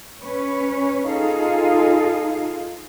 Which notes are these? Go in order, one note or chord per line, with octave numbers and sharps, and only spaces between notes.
C#4 B4 C#5
D#4 F4 G#4 A4 F5